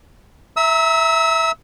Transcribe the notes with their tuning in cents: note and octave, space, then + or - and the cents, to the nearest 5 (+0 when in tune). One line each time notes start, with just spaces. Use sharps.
E5 +0 A#5 +0 E6 -35